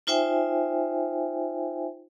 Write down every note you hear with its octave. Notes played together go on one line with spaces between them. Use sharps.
D#4 F4 C5 E5 G5 G#5